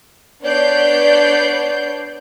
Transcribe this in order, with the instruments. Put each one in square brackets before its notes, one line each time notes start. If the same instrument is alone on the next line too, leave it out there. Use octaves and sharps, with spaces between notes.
[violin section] B3 D4 C#5 D5 G6 C7